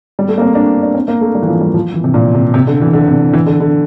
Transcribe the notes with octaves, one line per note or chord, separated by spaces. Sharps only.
G3
A3
A#3
C4
D4
D4
C4
A#3
A3
G3
E3
F3
G3
F3
E3
C3
A#2
C3
C3
D3
E3
D3
C3
E3
D3
D3